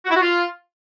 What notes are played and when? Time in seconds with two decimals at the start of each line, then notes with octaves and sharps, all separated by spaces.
0.06 F#4
0.11 E4
0.16 F#4
0.21 F4